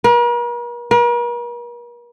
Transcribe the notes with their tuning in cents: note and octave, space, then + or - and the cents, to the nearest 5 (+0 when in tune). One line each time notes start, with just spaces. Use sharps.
A#4 +45
A#4 +45